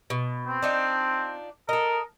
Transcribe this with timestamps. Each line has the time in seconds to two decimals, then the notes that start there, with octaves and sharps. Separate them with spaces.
0.10 B2
0.48 C4
0.62 D4 D#4 F4
1.69 A4 A#4 D#5